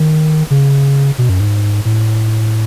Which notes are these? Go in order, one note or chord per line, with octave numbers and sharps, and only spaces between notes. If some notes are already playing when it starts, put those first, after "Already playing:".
Already playing: D#3
C#3
B2
F#2
G#2
A2